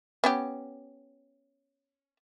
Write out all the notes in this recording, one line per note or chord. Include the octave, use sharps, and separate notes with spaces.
B3 C#4 G4